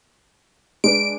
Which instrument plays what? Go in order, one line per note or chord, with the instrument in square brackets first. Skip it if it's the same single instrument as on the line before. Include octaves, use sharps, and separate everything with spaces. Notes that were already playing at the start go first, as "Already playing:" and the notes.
[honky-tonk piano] G#3 D4 B4 [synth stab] D7